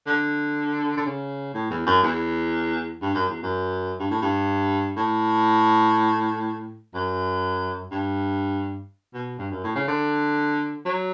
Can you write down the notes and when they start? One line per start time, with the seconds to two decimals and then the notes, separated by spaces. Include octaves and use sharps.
0.07 D3
0.97 D3
1.05 C#3
1.54 A2
1.70 E2
1.86 F#2
2.03 E2
3.02 G2
3.14 F#2
3.29 E2
3.43 F#2
4.00 G2
4.11 A2
4.22 G2
4.97 A2
6.94 F#2
7.92 G2
9.14 B2
9.39 G2
9.51 F#2
9.64 A2
9.75 C#3
9.88 D3
10.86 F#3